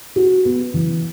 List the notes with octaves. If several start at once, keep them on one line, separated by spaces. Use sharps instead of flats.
F#4
B3
E3